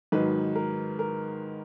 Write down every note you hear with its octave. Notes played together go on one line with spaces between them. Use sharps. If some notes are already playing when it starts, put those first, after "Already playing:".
G#2 D#3 F#3 B4
A#4
A#4